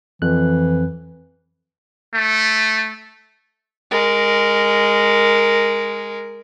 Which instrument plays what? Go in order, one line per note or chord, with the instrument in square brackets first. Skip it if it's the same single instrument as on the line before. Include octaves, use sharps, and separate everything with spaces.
[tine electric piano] F2 F#6 [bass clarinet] E3
[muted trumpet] A3
[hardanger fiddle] G#3 A#4